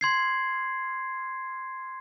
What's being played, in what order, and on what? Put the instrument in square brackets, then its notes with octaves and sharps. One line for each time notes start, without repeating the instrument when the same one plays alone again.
[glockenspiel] C6 G#6 C7